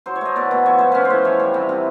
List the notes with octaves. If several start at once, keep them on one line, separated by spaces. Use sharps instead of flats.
F#3 C5
C#5
A3 D#5
B2 D5
B2 C#5
F3 C#5
A3 C5
C#4 B4
C5
A2
E3 C#5
G3
C3
C3